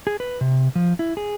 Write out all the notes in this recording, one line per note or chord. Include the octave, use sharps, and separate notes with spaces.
G#4
B4
C3
F3
E4
G#4